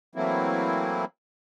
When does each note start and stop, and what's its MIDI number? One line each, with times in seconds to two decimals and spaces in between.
0.15 1.05 52
0.15 1.05 54
0.15 1.05 57
0.15 1.05 58
0.15 1.05 60
0.15 1.05 64